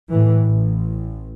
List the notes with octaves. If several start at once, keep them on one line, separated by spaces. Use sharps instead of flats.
A2 E3
A1